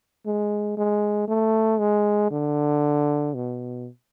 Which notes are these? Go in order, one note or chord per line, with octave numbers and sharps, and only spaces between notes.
G#3
G#3
A3
G#3
D3
B2